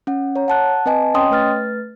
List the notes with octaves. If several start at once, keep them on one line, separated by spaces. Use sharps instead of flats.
C#4 F#5
C#5 A#5
F#5 A5 F#6
C4 B4 D#5 G#5 A5
C#4 C#5 D#5 G5 C6 D#6
A3 B4 F6 A6